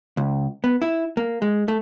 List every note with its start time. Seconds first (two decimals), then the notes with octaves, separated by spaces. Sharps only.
0.17 C#2
0.64 B3
0.82 E4
1.17 A#3
1.42 G#3
1.68 A3